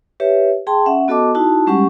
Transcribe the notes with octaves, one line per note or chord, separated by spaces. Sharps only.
G4 B4 C#5 E5
G#4 G5 A5 C6
C#4 E5 F#5
B3 F#4 A4 D#5 A5 D6
D#4 E4 F#4 A5
G3 G#3 C#4 G4 F#5 C#6